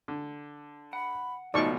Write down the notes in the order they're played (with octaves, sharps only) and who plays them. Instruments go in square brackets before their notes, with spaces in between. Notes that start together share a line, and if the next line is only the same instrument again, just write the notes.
[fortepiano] D3
[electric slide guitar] F#5 [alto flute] B5
[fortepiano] C#2 B2 F3 [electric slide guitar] A3 B3 [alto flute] D#4 [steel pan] D5 C#6